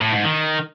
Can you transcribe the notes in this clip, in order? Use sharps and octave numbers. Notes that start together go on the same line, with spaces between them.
A2
G#2
D#3